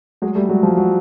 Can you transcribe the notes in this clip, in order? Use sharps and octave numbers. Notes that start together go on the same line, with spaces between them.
F#3 G#3
G3 A3
F#3 G#3
F3 G3
F#3